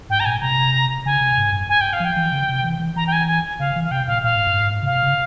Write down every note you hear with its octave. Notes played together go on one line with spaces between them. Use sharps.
G#2 G5
A#5
A#2 G#5
C3 A#5
C#3 G#5
C3
G#2
G2
G#5
G5
F5
F3 G5
E3
C#3
C3
E3
E3
E3 A#5
G5
G#5
G#5
C#3 F5
E3
F5
C3 G5
A#2 F5
A#2 F5
G#2
G2
G#2
C#3
C3 F5
C#3